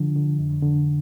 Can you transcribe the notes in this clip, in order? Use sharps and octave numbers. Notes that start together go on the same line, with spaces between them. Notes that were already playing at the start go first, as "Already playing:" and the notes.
Already playing: D3 F3
D3
F2
D3